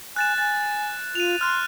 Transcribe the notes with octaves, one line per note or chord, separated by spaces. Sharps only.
G#5 F#6 A6 E7
G#5 A6
F4 D#7 F7
C6 F6 F#6